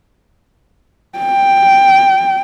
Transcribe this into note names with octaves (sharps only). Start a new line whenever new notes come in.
G5